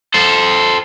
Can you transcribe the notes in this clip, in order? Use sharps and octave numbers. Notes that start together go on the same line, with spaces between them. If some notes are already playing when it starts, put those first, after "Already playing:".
A4 C5